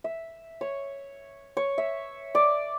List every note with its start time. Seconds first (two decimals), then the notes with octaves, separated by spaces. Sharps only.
0.04 E5
0.61 C#5
1.57 C#5
1.78 E5
2.35 D5